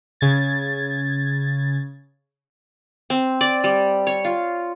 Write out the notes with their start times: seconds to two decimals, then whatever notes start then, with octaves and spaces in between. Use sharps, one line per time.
0.21 C#3 G#6 A6
3.10 C4
3.41 D5
3.64 G3
4.07 C#5
4.25 F4